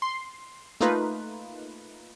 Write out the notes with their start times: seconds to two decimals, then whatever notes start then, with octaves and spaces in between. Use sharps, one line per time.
0.02 C6
0.80 A3 A#3 D#4 F4 B4